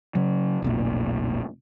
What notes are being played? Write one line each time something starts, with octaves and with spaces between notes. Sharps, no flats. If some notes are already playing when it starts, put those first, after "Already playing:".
C#3 F#3
F1 B1 A#2